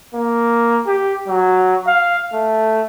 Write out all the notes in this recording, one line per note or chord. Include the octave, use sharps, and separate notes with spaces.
A#3
G4
F#3
F5
A3